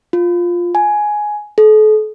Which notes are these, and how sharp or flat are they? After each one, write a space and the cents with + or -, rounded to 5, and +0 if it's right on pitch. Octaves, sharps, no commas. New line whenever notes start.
F4 +5
G#5 +10
A4 -40